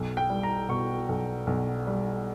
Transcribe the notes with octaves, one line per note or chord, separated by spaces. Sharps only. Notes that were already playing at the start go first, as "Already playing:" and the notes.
Already playing: B1
G5
G3
A#5
B2 C#6
B1
B1
G3